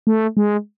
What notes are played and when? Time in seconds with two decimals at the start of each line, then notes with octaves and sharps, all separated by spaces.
0.07 A3
0.37 G#3